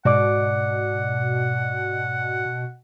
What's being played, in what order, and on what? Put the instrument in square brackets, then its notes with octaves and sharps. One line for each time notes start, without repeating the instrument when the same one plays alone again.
[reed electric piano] G#2 D5 D6 [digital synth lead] B2 [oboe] F#5